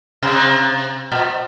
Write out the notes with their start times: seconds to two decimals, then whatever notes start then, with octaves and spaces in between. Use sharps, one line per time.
0.22 C3
1.12 A#2